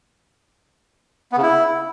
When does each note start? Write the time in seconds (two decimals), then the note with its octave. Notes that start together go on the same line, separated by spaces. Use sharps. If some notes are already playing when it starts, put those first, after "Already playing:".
1.32 B3
1.37 C#3
1.42 E4